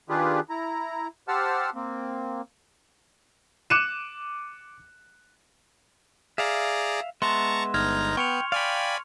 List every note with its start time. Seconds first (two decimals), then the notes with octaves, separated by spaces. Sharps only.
0.09 D#3 D4 F4 G4 G#4 B4
0.50 E4 A#5
1.28 G4 C5 F#5 A5 E6 F6
1.75 A#3 C4
3.70 D6 F#6 C#7 D#7 E7
6.38 G#4 D5 E5 F5 A#5
7.22 G#3 B3 E5 A5 A#5 C6 C#6
7.74 G1 D#4 A#5 F6 G#6
8.17 B3 G5 C#6 C#7 F7
8.52 D5 F5 G5 G#5 B5